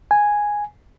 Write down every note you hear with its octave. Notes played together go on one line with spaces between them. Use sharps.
G#5